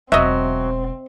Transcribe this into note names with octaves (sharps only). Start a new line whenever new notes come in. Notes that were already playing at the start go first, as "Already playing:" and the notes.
E1 F#3 C4 D#5 E5